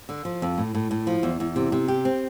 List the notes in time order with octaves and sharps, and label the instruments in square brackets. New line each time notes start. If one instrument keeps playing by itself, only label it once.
[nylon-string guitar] D3
F3
F2
A2
A2
A2
F3
E2
E2
C3
C3
G4
C4